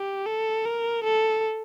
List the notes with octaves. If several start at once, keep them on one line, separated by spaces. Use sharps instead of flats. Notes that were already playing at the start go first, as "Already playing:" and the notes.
Already playing: G4
A4
A#4
A4